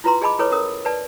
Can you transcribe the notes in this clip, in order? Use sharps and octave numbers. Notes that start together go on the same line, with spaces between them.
E4 F4 B4 A#5 C6
G#4 D#5 A5 B5 D6
E4 A4 B4 C#5 D6
C#4 A#4 D#6
B4 D5 A5